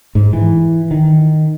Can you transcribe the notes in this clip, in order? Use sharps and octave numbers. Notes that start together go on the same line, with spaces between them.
G#2
E3
D#3